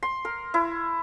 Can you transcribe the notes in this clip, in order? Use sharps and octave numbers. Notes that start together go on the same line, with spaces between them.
C6
A#4
E4